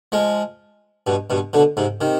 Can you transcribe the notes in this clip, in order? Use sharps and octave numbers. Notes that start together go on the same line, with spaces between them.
F3 G#3
G2 B2
G2 B2
B2 D3
G#2 C3
C3 D#3